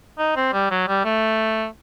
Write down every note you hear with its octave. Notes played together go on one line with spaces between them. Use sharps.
D#4
C4
G3
F#3
G3
A3